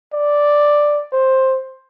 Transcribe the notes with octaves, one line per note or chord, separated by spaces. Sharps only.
D5
C5